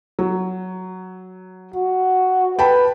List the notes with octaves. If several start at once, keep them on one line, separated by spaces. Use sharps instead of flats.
F#3
F#4
B4 G5 A5 B5